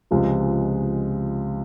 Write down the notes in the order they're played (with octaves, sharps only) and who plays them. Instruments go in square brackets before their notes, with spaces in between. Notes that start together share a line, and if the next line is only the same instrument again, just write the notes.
[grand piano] C#2 C3 F3 G#3